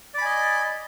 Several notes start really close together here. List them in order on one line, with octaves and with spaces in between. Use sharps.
D5 B5 G#5 D#5